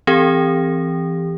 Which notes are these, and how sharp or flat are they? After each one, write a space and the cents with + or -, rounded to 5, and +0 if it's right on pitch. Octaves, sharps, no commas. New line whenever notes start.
E3 +15 C4 -5 G4 +30